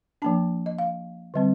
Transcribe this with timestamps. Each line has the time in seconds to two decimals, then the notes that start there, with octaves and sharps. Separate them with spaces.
0.22 F3 A#3 D4 A5
0.66 D#5
0.79 F5
1.34 D3 G3 C4